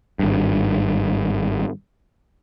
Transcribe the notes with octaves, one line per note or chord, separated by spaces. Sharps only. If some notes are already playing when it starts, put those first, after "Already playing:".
G#1 G2